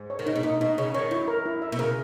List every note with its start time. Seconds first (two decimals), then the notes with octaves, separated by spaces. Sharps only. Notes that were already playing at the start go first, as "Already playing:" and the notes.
Already playing: G#2
0.10 C#5
0.19 D#3
0.26 C#3 D#4
0.36 B2
0.43 A#2 D#4
0.61 B2 D#4
0.78 C#3 C#5
0.94 D#3 C#5
1.11 F#2 E4
1.28 A#4
1.46 E4
1.62 E5
1.72 B2
1.79 C#3 A#4